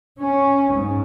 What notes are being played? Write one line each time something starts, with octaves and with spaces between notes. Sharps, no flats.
C#4
G#2